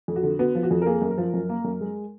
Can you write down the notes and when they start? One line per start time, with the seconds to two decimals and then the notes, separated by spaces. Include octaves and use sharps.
0.08 F2
0.16 F#4
0.23 D3
0.39 B3 F#4
0.55 F3
0.63 F#4
0.71 F2
0.82 A#4
0.86 A#3 G#4
1.02 F#2
1.10 A#4
1.18 F3
1.34 F#2
1.49 A#3
1.64 F#2
1.81 G#3